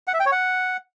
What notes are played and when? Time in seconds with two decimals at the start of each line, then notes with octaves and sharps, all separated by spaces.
0.08 F#5
0.14 E5
0.20 G5
0.26 C#5
0.32 F#5